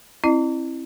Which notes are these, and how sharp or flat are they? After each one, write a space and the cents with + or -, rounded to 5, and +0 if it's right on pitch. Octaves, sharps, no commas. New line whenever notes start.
C4 +30 E4 +0 D#5 -45